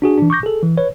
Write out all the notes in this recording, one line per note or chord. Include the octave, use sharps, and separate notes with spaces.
D4 F#4 G#4
E3 D4
C#6 D6 G6 A#6
G#4 A4
E3
B4 C#5